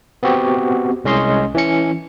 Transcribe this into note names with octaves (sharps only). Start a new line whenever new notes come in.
B3 C4 F#4 G4
C2 G#3 C#4 D#5 C6
E3 C#4 C#7